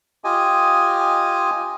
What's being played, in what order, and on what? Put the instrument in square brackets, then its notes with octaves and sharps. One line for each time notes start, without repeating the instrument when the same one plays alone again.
[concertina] F4 G4 D#5 G#5